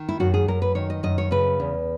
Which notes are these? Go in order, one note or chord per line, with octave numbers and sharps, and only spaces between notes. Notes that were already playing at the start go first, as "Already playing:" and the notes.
Already playing: D#3
E4
F#2 F#4
G#4
F#2 A#4
B4
D#3 C#5
D#5
F#2 D#5
C#5
C#3 B4
E2